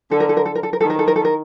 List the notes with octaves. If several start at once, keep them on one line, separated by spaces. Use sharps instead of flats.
D3 A4
A#4
A4
A#4
A4
A#4
A4
A#4
D#3 A4
A#4
A4
A#4
A4
A#4